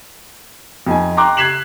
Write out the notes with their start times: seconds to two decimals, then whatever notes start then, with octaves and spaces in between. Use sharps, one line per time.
0.87 F2 D#4 G#5
1.17 G5 A#5 C6 D6 F#6
1.37 F#6 G#6 B6 C7 E7 F#7